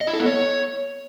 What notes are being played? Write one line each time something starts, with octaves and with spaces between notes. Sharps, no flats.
D#5
E4
A4
B3
C#5